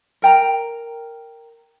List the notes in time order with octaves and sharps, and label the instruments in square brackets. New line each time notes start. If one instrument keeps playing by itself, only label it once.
[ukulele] A#4 G5 A#5